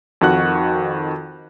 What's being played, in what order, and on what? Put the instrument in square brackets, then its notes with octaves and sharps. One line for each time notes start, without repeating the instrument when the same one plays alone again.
[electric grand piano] F2 D#3 F#4 F#5 F#6